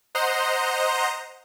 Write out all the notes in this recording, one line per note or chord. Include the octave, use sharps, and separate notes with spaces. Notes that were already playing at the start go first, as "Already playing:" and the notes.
C5 D#5 F#5 A#5 C6